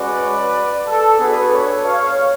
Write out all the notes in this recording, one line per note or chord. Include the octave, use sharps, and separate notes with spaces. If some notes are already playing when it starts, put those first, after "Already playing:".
Already playing: G#3 C#4 F#4 B4 D5
A4
B3 D4 F#4 G#4 B4
A4 C#5
C#5 F5